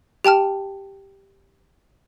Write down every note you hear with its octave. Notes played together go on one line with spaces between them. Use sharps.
G4 G5 A5 F6